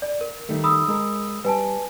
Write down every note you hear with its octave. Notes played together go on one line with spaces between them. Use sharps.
D5
A#4
D#3 G3 A3
B5 D#6 E6
G#3 A#4
G3 B4 G#5 A5